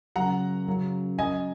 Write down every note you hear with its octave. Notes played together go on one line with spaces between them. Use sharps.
F#2 C#3 F#3 F#5 A#5
F#2 C#3 F#3
F#2 F#3 D#5 G#5